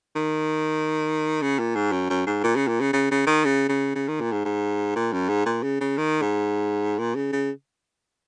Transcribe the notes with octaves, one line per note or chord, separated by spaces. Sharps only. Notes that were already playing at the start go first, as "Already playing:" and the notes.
D#3
C#3
A#2
G#2
F#2
F#2
G#2
A#2
C#3
A#2
C#3
C#3
C#3
D#3
C#3
C#3
C#3
D#3
A#2
G#2
G#2
A#2
F#2
G#2
A#2
C#3
C#3
D#3
G#2
A#2
C#3
C#3